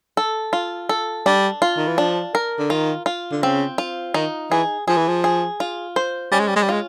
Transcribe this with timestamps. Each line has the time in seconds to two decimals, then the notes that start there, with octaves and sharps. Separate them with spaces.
0.17 A4
0.53 F4
0.89 A4
1.26 G3 D4
1.62 F4
1.77 D#3
1.87 E3
1.98 F3 D4
2.35 A#4
2.59 D3
2.70 D#3 F4
3.06 F4
3.32 D3
3.42 C#3 C4
3.78 F4
4.14 D#3 D#4
4.51 E3 G#4
4.88 F3 G#4
4.97 E3
5.08 F3
5.24 G#4
5.60 F4
5.96 C5
6.32 G3 C#4
6.40 G#3
6.48 G3
6.56 G#3
6.63 G3
6.69 G#3 F4